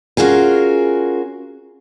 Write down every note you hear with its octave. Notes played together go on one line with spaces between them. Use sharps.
C#4 F4 F#4 G#4 A#4